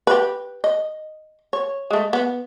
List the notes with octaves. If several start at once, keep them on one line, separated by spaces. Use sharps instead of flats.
G4 B4
D#5
C#5
G#3 A3
B3